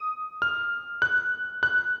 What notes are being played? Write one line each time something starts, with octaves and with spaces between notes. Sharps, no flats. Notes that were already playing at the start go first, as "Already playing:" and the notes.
Already playing: D#6
F6
F#6
F#6